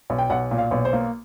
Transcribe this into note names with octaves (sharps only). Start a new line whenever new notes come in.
B1
G5
B1 F#5
A#2
F5
B1
C5
A#3